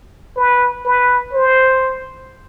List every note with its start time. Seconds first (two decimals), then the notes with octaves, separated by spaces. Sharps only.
0.37 B4
0.85 B4
1.33 C5